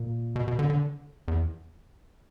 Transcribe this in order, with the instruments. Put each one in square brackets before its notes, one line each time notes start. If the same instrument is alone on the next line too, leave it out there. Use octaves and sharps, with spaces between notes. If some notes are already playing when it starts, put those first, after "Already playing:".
Already playing: [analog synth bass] A#2
B2
B2
D3
D3
E2